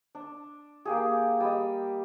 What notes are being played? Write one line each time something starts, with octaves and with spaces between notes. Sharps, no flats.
D4
A#3 G4 G#4
G3 D#5